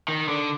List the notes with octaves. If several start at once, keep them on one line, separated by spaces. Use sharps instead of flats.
D#3
D3